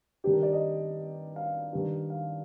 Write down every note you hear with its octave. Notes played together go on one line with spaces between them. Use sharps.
G2 D#3 G4
A#4
D5
D#5
F5
G2 D#3
F5